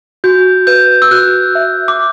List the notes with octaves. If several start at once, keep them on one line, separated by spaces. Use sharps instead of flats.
F#4 G6
B4 G6
E6
F#4 F#6
E5
D6